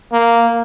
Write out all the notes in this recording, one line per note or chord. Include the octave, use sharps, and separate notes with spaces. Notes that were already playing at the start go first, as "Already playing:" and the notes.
A#3